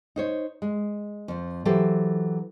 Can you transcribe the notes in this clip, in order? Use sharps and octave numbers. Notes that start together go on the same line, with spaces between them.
D#4 C5 C#5
G#3
F2 F3
E3 F#3 G4 A4 C5